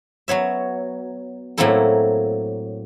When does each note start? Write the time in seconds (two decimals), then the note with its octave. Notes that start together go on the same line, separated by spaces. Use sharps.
0.28 F#3 B3 C#5 E5
1.58 A2 F#3 A#3 C4 E4 A4